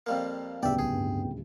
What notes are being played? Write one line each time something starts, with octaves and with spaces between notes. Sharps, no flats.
F2 G3 A#3
D1 C2 C#3 B3 D5 E5 G5
B1 G#4
G2